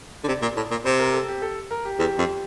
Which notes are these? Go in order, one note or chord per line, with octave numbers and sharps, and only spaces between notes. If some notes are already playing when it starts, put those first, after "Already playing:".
D3
C3 D5
A#2
A2
A#2
C3 C5
A#4
A4
G4
A4
A#4
G4
E2 G4
F2